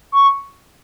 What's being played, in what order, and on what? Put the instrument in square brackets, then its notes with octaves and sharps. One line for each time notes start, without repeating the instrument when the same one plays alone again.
[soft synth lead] C#6